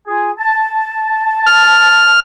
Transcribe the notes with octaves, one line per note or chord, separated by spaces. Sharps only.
F4 G#4 G#5
A5
F6